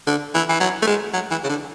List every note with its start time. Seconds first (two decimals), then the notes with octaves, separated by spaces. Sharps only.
0.07 D3
0.34 E3
0.49 E3
0.60 F#3
0.82 A3
0.87 G#3
1.13 F#3
1.31 E3
1.44 C#3
1.49 D3